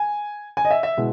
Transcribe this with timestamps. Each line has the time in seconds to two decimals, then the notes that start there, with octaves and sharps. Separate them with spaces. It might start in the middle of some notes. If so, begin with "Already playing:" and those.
Already playing: G#5
0.57 G#5
0.65 D#5
0.71 E5
0.83 E5
0.97 B2 G#3 E4